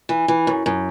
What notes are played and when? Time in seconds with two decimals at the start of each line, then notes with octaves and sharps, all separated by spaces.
0.09 E3
0.28 E3
0.47 F#2
0.66 F#2